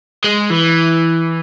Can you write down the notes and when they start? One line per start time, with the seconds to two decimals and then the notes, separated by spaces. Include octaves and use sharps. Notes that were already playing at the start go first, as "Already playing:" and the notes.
0.24 G#3
0.50 E3